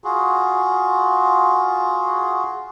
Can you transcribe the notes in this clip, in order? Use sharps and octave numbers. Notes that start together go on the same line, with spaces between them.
F4 F#4 G#4